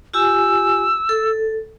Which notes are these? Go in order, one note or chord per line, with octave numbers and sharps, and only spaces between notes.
F4 G4 G#5 E6
A4